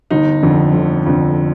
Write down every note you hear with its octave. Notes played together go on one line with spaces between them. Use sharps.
G1 D#4
F2 D3
G1
F2 D3